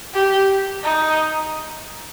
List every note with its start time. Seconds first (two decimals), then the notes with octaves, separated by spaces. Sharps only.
0.14 G4
0.84 D#4